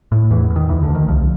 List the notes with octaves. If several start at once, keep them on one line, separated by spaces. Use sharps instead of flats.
A2
E2 E3
E2
D#3
D2 E3
D3
D2
D#3
C2 F3